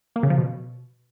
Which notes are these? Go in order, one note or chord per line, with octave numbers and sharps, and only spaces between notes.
A#3
C#3
F3
B2